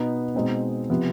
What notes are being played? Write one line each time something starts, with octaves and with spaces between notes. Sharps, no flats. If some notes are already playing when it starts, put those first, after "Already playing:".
Already playing: B2 B3 D#4
B2 G#3 C4 D#4
C3 F3 B3